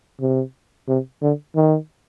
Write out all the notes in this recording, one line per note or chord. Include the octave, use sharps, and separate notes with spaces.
C3
C3
D3
D#3